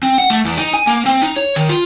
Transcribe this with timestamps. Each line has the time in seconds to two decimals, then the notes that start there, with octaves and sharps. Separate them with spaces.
0.03 C4
0.18 F#5
0.30 A3
0.45 E2
0.58 D#4
0.74 G#5
0.87 A#3
1.06 C4
1.22 D#4
1.36 C#5
1.56 D#3
1.69 F4